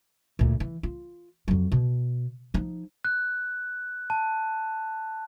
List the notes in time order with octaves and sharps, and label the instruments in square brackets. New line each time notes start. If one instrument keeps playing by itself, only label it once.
[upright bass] D2 A#2
E3
F4
F2 F#3
B2
F3 D#4
[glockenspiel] F#6
A5